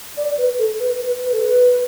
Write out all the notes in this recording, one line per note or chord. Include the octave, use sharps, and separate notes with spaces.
D5
B4
A4
B4
B4
B4
A4
B4